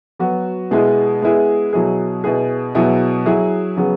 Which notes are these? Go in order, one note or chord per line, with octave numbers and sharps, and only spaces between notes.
F#3 B3 F#4
B2 G#3 B3 E4 G#4
G#3 B3 E4 G#4
B2 F#3 E4 G#4
B2 B3 E4 G#4
B2 F#3 B3 E4 G#4
F#3 E4 G#4
C#3 F#3 B3 G#4